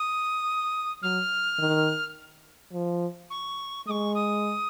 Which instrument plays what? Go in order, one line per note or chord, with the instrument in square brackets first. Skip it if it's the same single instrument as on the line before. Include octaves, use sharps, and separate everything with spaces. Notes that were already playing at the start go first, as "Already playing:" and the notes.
Already playing: [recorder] D#6
[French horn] F#3 [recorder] F6
[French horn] D#3
F3
[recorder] C#6
[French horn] G#3 [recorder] C#6 D#6
[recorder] D#6